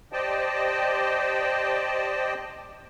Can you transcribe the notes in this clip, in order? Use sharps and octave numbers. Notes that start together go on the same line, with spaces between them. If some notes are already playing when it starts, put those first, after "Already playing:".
G4 C5 D5 D#5 G5 A5